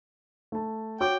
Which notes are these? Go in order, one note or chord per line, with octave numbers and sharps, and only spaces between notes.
A3 A5
F#4 C#5 G5 D6